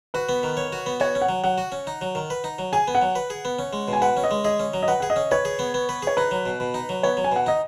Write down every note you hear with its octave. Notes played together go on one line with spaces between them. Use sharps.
F#4 B4
B3
D#3
C#5
F#4
B3
F#4 C#5
C#4
F#5
F#3
F#3 F#5
F#4
C#4
D#4
F#3
D#3
B4
D#4
F#3
G#4 G#5
B3
F#5
F#3
B4
G#4
B3
C#4
G#3
B2
G#5
B4 F#5
C#4
D#5
G#3
G#4 D#5
C#4
F#3
D#5
B4 F#5
G#4 F#5
D#5
C#4
B4 C#5
G#4
B3
B3
B4
G#4 C#5
D#4 B4
F#3
B2
B2
D#4
F#3
B3 C#5
F#3
G#5
B2 F#5
D#4 D#5